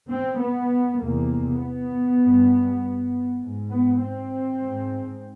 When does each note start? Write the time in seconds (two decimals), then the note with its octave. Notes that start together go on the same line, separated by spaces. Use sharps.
0.10 C4
0.40 B3
1.00 E2 C3 A#3
1.61 B3
2.22 G2
3.42 G#2
3.72 B3
4.02 C4
4.63 G#2